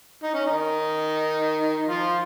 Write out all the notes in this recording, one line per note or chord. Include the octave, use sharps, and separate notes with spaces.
D#4
C#4
D#3 D#4
F3 F4